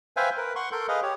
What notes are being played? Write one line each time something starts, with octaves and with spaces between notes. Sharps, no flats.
B4 C5 E5 F5 G5 G#5
A#4 B4
F#5 C6 C#6
A4 A#4 C6 G6
G#4 B4 D#5 F5
G4 C#5